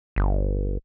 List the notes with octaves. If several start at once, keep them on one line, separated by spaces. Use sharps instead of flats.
G1